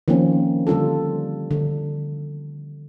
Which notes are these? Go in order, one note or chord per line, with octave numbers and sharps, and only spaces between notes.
D#3 F3 A#3 C4 C#4
D3 G3 D4 F4 A4
D3